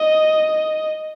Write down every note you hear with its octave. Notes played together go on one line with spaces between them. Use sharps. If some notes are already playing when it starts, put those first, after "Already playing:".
Already playing: D#5